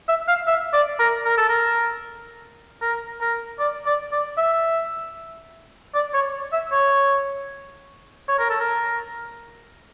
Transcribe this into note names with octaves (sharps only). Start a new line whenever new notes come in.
E5
F5
E5
D5
A#4
A#4
A4
A#4
A#4
A#4
D5
D5
D5
E5
D5
C#5
E5
C#5
C#5
A#4
A4
A#4